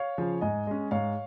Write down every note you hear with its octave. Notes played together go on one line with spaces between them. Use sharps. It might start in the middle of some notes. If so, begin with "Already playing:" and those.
Already playing: C#5 F5
C#3 F3
G#2 D#5 G#5
G#3 C#4
G#2 C#5 F5